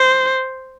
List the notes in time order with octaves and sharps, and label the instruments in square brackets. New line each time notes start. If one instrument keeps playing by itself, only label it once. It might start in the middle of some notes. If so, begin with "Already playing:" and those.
Already playing: [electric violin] C5